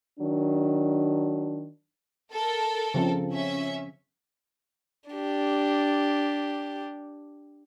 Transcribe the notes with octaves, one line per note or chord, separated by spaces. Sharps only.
D#3 F#3 D4
A4 A#4
C#3 F3 C4
C#4 E5
D4 G4